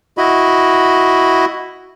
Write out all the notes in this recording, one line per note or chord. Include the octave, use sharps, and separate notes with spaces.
E4 F#4 D#5 B5